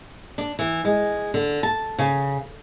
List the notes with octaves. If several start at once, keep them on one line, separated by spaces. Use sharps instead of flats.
D4
E3
G#3
D3
A5
C#3